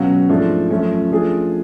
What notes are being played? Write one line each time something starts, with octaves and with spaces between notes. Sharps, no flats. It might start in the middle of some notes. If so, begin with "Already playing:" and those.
Already playing: C#2 B2 F#3 C#4 F#4
G#2 F3 A3 D4 F4
F#2 F3 A3 C#4
F3 A3 D4 F4 G#4